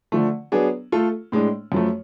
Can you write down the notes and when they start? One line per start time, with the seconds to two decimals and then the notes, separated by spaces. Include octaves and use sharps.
0.12 D3 F3 A3
0.52 F#3 B3 D4 G#4
0.92 A3 F4 A4
1.32 A2 G#3 D4
1.72 F#2 F3 A3